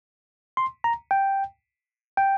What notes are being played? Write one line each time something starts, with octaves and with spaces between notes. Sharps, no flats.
C6
A#5
G5
G5